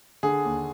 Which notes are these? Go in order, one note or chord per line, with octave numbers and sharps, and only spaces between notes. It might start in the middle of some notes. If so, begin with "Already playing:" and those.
D3 G#4
D#2